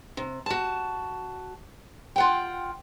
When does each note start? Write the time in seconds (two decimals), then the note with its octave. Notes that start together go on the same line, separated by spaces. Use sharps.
0.17 C3
0.46 F#4 A5
2.16 F4 F#5 G5